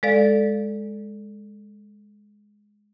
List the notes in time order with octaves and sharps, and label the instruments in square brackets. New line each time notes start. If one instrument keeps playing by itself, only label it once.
[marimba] G#3 A4 D5 F5